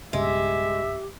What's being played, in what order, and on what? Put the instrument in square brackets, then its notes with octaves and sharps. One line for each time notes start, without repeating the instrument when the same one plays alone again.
[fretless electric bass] B1 G2 C#3 [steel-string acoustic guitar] G#3 [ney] G4 [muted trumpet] E5